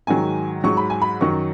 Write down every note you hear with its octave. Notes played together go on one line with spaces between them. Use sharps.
G#2 D#3 F#3 G#5
G#2 F#3 C#6
B5
G#5
B5
F#2 D#3 F#3 C#6